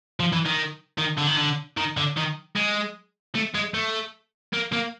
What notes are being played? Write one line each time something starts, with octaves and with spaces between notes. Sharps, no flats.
F3
E3
D#3
D#3
D3
D#3
D3
D#3
D3
D#3
G#3
A3
G#3
A3
A#3
A#3